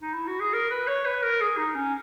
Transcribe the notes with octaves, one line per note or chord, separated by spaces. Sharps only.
D#4
E4
F#4
G#4
A#4
B4
C#5
B4
A#4
G#4
D#4
C#4